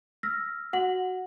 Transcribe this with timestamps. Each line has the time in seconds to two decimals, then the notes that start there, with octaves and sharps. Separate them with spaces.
0.23 E6 F6 A#6 B6
0.73 F#4 F#5 A#6 F#7